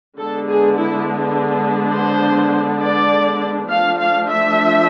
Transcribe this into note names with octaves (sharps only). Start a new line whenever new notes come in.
D3 G#3 B3 D4 A4
G#4
E4
C5
D5
F3 A3 D4 F5
F5
E5